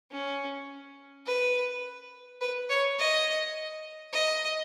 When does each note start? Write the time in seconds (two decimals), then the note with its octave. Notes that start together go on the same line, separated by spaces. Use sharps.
0.11 C#4
1.26 B4
2.41 B4
2.70 C#5
2.99 D#5
4.13 D#5